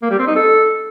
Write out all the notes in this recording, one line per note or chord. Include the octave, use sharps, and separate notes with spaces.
A#3
G3
C4
D#4
A4